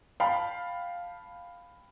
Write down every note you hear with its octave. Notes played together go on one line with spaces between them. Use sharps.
F5 G5 A5 B5